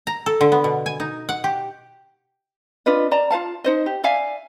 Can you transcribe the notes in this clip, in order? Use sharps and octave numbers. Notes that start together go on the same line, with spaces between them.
A#5
A4
D3
B3
B2
G#5
D#4
F#5
G4
D4 F4 B4 D#5
D5 A5 A#5
F4 B4 F5 A5
D#4 C5 D#5
G4
D5 E5 F5 G#5